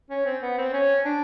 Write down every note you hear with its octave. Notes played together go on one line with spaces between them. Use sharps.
C#4
C4
B3
C4
C#4
D4